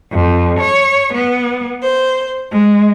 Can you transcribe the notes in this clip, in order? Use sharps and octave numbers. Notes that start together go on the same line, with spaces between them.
F2
C#5
B3
C5
G#3